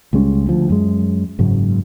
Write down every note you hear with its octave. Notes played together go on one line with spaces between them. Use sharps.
C#2 G3 G#3 C#4
D2 F3
F#2 G#3
F#1 G#2 C#3 F#3